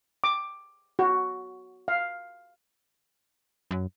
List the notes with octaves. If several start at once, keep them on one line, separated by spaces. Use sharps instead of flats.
D6
F#4
F5
F#2